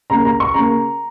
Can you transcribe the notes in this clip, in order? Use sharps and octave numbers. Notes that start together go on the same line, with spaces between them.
C#3 A#3 A#5
A#5
C#6
C#3 A#3 A#5